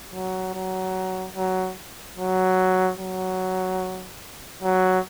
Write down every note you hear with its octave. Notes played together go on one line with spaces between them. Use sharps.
F#3
F#3
F#3
F#3
F#3
F#3